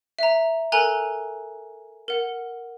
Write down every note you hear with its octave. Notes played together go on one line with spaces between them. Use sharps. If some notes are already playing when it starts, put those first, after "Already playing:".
E5 A#5
A4 A#4 G#5 A#5 F#6
A#4 F#5